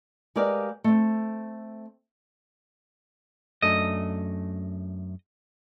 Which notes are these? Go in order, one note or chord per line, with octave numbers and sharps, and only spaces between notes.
G#3 G4 A#4 B4 D5 F5
A3 C4
F#2 A3 D4 D#5